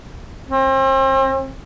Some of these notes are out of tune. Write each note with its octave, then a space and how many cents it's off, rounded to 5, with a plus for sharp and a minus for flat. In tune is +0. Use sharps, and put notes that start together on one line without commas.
C4 +40